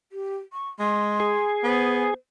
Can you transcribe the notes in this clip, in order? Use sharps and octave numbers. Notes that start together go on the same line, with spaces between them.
G4
C#6
G#3 C6
G#4
B3 C5